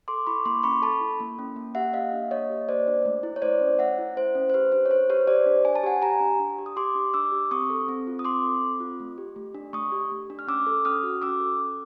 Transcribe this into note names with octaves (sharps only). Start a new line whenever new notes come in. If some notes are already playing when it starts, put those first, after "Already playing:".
A4 C6 D6
E4 B5 C#6
A#3 C6 D6
C#4 B5 C#6
A4 A5 B5
E4
A#3
C#4
A#3
G4 E5 F#5
A#3 D#5 F5
D4
A#3 C#5 D#5
G4
A#3 C5 D5
D4
A3
E4
C#5
A3 C5 D5
C#4
A3 E5 F#5
E4
A3 C5
C#4
C5
G4 B4
D4 C5
C#5
D4 C5
G4 B4 C#5
G4 C5 D5
D4
D4 G#5
A5
G4 F#5 G#5
G4 G#5 A#5
D4
D4
G4
D#6
G4 C6 D6
D4
D4 D6 E6
G4
C4 C#6 D#6
A4
C4
F4
D#6
C4 C6 D6
A4
C4
F4
A3
G4
A3
D4
A3 C#6 D#6
G4
A3
D4
F6
C#4 D6 E6
A4
C#4 D#6 F6
F#4
C#4 D6 E6
A4
C#4